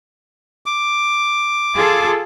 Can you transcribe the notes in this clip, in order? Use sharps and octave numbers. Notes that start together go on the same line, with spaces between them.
D6
F4 G#4 A4